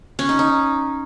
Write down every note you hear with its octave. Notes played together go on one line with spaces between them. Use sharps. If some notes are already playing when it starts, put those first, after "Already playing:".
C#4
D#4
D#4